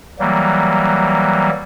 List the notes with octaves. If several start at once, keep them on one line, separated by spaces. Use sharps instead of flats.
E3 F#3 G3 A#3